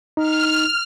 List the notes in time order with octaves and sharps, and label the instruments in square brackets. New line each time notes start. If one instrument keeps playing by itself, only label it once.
[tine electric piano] D#4 [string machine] F6